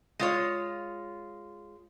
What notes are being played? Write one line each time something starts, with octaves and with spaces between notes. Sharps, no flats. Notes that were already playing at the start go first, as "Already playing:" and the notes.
G#3 F4 C#5